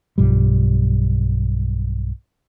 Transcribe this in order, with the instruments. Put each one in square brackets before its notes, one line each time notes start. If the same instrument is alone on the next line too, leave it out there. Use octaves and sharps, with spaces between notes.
[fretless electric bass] B1 G2 F3 G3